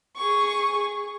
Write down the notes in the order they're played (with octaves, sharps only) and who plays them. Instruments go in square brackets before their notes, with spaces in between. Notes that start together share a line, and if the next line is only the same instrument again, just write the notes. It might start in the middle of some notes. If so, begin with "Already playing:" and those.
[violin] G#4 C#6